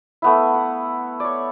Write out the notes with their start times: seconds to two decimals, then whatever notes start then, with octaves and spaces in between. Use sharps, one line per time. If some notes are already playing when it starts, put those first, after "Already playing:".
0.22 A3 B3 E4
0.54 F#5
1.20 C#5 D5